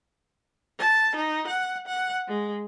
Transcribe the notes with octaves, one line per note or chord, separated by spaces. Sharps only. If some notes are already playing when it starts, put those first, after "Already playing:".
A5
D#4
F#5
F#5
G#3